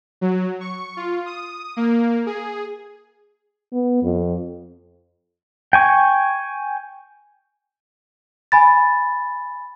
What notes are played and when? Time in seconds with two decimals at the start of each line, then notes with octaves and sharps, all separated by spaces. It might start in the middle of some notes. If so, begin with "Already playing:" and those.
0.21 F#3
0.61 C#6
0.97 F4
1.26 D#6
1.77 A#3
2.26 G#4
3.73 B3
4.03 F2
5.73 G5 G#5 C#6
8.52 G#5 B5 A6